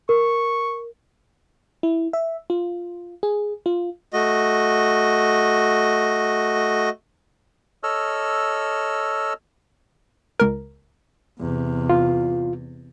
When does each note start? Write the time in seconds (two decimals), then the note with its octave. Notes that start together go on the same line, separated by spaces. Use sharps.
0.09 A#4 C#6
1.83 E4
2.13 E5
2.50 F4
3.23 G#4
3.66 F4
4.13 A3 F#4 D#5
7.83 A4 C#5 D#5 E6 F6
10.40 C#2 A#4
11.40 E2 C3
11.90 F4